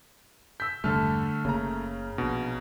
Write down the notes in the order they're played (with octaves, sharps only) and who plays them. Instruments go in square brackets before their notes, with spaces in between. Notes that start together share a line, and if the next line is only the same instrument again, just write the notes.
[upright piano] E6 B6 [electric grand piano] G6
[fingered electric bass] E1 G2 G3 [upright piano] D3 A5 F6 [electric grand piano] A3
[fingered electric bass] F#1 A#3 C#4 [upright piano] C#3 A#5
[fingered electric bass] A#1 A#3 D4 [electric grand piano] B2